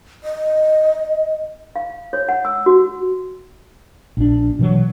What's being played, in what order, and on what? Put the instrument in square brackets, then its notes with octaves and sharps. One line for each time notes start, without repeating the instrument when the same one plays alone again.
[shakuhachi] D#5
[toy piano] F5
C#5
F#5
E6
F#4
[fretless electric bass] A#1 D4
B2 E3 F#3